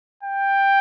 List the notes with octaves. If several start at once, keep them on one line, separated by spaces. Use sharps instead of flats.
G5